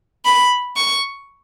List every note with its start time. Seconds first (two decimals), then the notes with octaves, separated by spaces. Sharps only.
0.25 B5
0.77 C#6